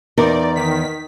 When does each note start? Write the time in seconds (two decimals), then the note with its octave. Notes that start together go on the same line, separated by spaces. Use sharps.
0.18 E2 D#4 A#4 D5
0.56 D#3 B6